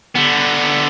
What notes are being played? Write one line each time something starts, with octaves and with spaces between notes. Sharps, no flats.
D3 B3